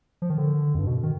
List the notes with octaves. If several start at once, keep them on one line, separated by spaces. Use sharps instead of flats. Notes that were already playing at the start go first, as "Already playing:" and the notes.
F3
D#3
D3
F2
G2
B2
D#3